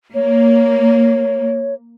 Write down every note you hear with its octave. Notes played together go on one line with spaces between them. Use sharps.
A#3 C#5